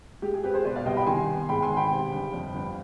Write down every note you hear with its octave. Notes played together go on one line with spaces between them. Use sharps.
G#3 G4
G#4
C4 G4 B4
G#4 C5
B2 B4 D5
D5 F5
C2 D#5 G5
G5 B5
D#3 G#5 C6
B3
G#2 G5 B5
G#5 C6
G#1
G5 B5
C3
G1
F2
G1